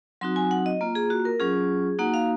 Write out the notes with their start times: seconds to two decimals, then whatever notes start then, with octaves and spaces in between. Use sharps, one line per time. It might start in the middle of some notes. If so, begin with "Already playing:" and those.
0.21 F#3 C4 D#4 F#4 C6
0.36 G#5
0.51 F#5
0.66 D#5
0.81 A#3 F4
0.95 G#4
1.10 F#4
1.25 A#4
1.40 F#3 C#4 F4 G#4
1.99 A#3 D#4 F#4 F#5
2.14 F5